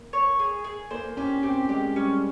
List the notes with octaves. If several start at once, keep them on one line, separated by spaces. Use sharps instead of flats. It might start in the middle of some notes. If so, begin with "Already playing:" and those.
Already playing: A#3
C#5
G#4
G#4
A#3 C5
C#4 G4
C4 G4
G#3 G4
G3 C#4